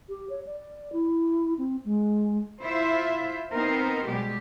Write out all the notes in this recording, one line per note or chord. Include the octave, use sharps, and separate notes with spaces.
G4
C#5
D5
E4
C4
G#3
E4 F4 C5 E5
B3 C4 D#4 A#4 C5
B2 G3 G#3 G4